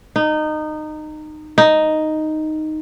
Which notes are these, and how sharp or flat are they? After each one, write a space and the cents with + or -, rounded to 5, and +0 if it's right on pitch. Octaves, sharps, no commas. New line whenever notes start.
D#4 -20
D#4 +0